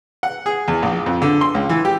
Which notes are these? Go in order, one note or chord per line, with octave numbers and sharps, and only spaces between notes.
F#5
G#4
E2
A#1
F2
D3
C6
C#2
E3
G4